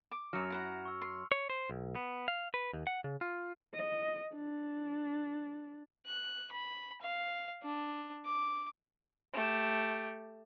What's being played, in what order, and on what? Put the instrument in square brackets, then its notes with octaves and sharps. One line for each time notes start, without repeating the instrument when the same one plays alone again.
[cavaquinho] D6
[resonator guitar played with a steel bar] F#2 F#3 [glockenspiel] F6 C#7 F7
[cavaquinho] E4 F#5 A#5
[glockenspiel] C#6 E6
[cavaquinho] C6
[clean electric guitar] C#5
C5
B1
B3
F5
B4
D#2
F#5
C#3
F4
[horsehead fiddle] D#5
D4
[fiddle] F#6
B5
F5
D4
D6
[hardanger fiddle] A3 G4